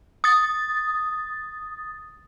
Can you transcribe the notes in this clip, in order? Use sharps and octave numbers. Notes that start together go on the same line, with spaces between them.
D#6 A6